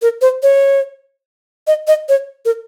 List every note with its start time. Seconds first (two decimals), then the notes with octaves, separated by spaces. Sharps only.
0.02 A#4
0.21 C5
0.43 C#5
1.67 D#5
1.87 D#5
2.09 C#5
2.45 A#4